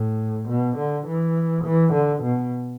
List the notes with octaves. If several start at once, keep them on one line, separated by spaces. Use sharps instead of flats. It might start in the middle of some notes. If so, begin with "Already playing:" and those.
Already playing: A2
B2
D3
E3
E3
D3
B2